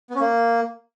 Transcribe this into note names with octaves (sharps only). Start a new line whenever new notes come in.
B3
C#4
A#3